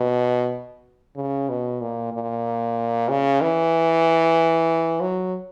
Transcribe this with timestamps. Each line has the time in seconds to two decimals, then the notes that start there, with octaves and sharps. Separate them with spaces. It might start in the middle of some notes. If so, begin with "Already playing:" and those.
Already playing: B2
1.16 C#3
1.49 B2
1.81 A#2
2.13 A#2
3.09 C#3
3.41 E3
5.01 F#3